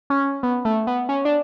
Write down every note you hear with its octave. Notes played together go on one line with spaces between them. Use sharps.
C#4
B3
A3
B3
C#4
D4